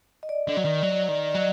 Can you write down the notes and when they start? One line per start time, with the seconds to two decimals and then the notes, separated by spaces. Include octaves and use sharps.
0.23 D#5
0.29 D5
0.48 D3
0.55 F#3 D5
0.65 D#3
0.82 F#3 D5
1.09 D#3
1.31 D5
1.35 F#3 D#5